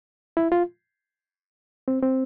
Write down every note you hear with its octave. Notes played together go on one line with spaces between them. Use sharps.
E4
F4
C4
C4